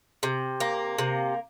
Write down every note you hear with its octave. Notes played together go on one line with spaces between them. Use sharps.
C3
A#3
C3